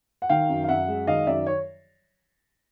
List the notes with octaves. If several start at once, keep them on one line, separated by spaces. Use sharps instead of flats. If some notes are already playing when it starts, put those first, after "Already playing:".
F#5
D#3 F5 G5
F#2
F5
F#2 E5 F#5
G#3
D#3 D#5 F5
F#2 D5 E5
C#5